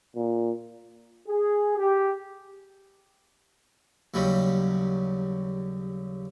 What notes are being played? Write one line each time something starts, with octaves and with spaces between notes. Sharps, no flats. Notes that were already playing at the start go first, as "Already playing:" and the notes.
A#2
G#4
G4
D#2 C#3 F#3 G3